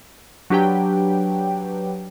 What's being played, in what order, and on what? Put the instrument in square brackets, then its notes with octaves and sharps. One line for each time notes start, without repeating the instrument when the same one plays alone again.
[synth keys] F#3 D4 G4 B4 G5